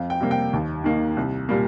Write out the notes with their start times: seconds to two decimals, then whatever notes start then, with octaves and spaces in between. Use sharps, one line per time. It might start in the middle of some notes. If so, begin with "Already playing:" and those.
Already playing: F2 F5
0.10 G5
0.20 C3 G3 A#3
0.31 G5
0.53 D#2
0.84 D#3 A#3
1.17 C2
1.49 A#2 G3 A#3